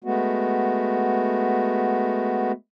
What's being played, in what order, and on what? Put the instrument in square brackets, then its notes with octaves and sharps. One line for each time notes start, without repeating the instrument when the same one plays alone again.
[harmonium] G#3 A3 B3 F#4